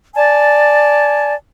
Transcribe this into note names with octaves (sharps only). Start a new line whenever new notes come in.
D5 G#5 A5